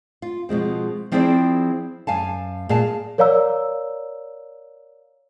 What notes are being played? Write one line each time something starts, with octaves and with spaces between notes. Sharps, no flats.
F4
B2 F3 G#3 C4
F3 C4 E4 G#4 C5 D5
F#2 F5 G#5 A5
A#2 G#4 F5 A5
A#4 C#5 D5 F5 A#5 E6